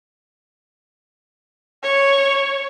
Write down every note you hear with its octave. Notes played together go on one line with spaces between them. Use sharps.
C#5